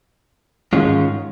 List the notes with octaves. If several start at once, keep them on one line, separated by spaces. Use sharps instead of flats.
G#2 D#3 G#3 C#4 F4